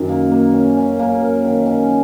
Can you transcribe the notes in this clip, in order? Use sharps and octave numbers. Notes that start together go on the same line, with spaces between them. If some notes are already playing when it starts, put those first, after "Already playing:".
Already playing: F#2 D#3
A#3
A#3
C#4
C#4
A#3
A#3
D#3
C#4